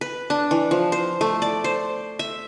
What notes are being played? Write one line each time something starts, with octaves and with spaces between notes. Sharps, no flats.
B4
D4
E3
F3
C5
A3
D5
C5
E5